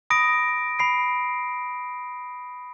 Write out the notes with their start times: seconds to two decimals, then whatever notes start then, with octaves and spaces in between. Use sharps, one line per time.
0.10 B5 D#6 A#6 D7
0.79 B5 C7 D7